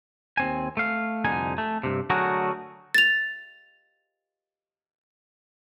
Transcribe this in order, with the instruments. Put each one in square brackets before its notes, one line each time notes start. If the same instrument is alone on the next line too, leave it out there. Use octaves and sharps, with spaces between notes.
[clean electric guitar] D#2 C4 G#5
A3 F5
C2 F2 D3 D#4 G#5
A3
G2 C3
D3 F#3 A3 F#4 G#4 A#4
[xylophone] A6 F7